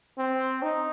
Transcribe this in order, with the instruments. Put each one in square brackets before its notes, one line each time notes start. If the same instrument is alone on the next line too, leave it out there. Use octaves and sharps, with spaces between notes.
[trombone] C4
D#4